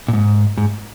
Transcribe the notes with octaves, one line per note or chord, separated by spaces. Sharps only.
A#2
G#2
G#2